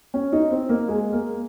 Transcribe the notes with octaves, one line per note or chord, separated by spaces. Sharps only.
C#4
D#4
C4
A#3
G#3
A#3